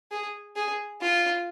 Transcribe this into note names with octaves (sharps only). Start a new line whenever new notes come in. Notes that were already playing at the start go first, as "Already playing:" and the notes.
G#4
G#4
F4